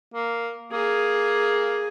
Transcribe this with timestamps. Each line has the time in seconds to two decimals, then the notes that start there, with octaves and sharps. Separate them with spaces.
0.14 A#3
0.72 A#3 G#4